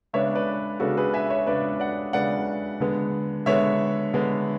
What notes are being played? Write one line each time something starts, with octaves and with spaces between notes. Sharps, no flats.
C#3 G#3 B3 D4 C#5 E5
B4 D5
C#3 G#3 B3 D4 F#4 A4
G#4 B4
E5 G#5
C#5 E5
C#3 G#3 B3 D4 B4 D5
D5 F#5
C#3 G#3 B3 D4 D5 F#5
D3 G#3 B3
D3 G#3 B3 C#5 E5
D3 G#3 B3